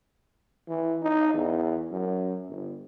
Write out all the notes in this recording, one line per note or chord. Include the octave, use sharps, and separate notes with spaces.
E3
D#4
E2
F#2
G1